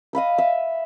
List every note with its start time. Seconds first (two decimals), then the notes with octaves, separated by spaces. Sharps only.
0.13 D#5 F5 B5 E6
0.38 E5